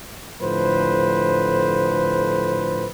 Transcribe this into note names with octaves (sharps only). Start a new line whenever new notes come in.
A2 D3 F3 B4 C5